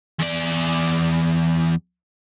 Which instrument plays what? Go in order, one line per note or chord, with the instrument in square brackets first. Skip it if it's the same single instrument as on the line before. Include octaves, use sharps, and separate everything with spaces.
[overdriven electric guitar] E2 D5